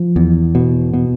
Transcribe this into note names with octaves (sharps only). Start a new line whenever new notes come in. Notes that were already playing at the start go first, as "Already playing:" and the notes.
Already playing: F3
E2
B2
B2